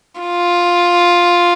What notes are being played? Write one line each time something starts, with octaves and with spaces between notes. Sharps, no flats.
F4